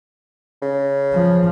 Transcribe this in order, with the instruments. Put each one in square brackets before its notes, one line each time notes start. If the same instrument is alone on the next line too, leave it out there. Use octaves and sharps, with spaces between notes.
[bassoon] C#3
[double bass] F3